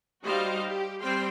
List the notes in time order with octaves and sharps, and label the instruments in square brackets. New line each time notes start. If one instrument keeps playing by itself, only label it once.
[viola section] G3 D#4 F#4 C5 D#5 F5
G4
G3 C4 C5 F5 G5 C6